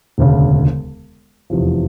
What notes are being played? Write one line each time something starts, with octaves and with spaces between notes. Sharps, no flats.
E1 D2 C#3
F1 E2 C3 F3